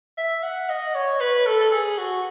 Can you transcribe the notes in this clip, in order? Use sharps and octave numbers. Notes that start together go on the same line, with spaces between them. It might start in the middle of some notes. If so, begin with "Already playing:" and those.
E5
F#5
D#5
C#5
B4
A4
A4
G#4
F#4